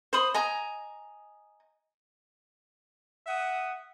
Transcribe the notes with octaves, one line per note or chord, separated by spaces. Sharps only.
C5 B5 D#6
D#5 G#5 A#5
E5 F#5 D#6